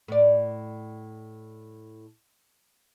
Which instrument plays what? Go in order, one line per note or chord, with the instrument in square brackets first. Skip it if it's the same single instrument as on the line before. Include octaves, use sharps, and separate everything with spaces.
[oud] A2 D5